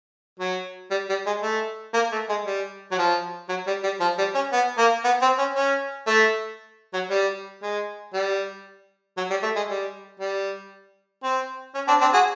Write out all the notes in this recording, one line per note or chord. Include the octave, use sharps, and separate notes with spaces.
F#3
G3
G3
G#3
A3
A#3
A3
G#3
G3
F#3
F3
F#3
G3
G3
F3
G3
C#4
B3
A#3
B3
C4
C#4
C#4
A3
F#3
G3
G#3
G3
F#3
G3
A3
G#3
G3
G3
C4
C#4
C4 D4
C4 D4
F#4 G#4